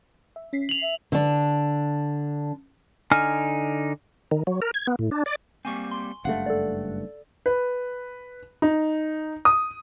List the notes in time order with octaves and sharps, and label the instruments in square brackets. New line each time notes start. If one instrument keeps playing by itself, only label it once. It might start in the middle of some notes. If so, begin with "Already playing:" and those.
[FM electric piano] E5
C#4 B6 C7
[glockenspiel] F7 F#7
[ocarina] E5
[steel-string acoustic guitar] D3 D4
[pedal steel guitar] D3 D#4 G#5 F6
[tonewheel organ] D#3
F#3
A#4
G#6
B3
A2
D4
D5
[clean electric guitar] G3 A#3 C4 [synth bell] G#5 C#6
[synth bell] C6
[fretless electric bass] F#1 G2 A3 [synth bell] F5 [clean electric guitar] F#5
[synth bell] A4 D5
[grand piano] B4
D#4
D#6